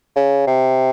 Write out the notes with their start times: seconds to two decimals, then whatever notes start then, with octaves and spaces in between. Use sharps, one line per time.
0.17 C#3
0.47 C3